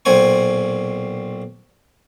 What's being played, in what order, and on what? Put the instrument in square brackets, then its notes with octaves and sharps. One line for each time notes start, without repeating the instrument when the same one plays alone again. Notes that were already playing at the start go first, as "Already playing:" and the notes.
[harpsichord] B1 A#2 C4 C5 G#5 C#6